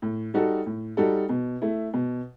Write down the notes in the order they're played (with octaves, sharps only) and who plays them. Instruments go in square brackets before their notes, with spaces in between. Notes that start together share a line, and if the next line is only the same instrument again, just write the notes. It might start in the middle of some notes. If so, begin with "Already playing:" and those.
[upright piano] A2
G3 D#4 F#4 A4
A2
G3 D#4 F#4 A4
B2
A3 E4
B2